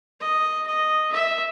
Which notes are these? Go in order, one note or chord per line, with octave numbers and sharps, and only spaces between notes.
D#5
D#5
E5